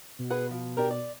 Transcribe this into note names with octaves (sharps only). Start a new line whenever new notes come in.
B2
G#4 B4 F#5
F3
D4 G4 A#4
D5